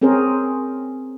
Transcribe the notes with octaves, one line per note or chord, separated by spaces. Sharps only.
C4 C#4 G#4 A#4 C5